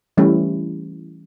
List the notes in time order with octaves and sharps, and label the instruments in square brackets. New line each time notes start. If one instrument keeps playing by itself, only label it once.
[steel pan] E3 G3 A3 C#4 E4